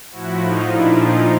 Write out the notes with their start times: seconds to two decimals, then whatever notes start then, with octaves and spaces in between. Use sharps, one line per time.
0.11 A2 F3 E4 F#4
0.40 D#4 F4
0.69 A#2 F3 D4 E4
0.97 D#4 F4